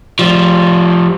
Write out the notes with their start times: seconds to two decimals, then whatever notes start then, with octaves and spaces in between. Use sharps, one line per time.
0.19 F3 G3